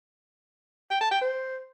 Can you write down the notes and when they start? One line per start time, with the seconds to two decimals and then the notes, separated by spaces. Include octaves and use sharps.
0.90 G5
1.01 A5
1.11 G5
1.21 C5